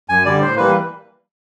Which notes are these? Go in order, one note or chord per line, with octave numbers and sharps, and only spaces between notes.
F#2 G#5
D3 G3 D5
A2 C5
E3 G3 A#3 B4